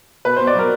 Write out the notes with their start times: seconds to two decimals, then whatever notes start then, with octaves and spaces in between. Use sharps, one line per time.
0.25 B2 B4
0.36 C5
0.40 B2
0.47 D5
0.55 F#3 A#4